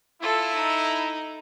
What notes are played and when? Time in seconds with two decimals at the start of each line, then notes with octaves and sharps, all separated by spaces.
0.21 E4 F4 A4
0.54 D#4